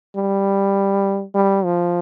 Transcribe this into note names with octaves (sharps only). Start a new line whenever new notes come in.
G3
G3
F3